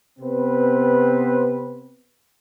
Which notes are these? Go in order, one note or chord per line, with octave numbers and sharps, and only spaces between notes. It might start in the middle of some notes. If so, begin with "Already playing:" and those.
C3 B3 C4 B4 C5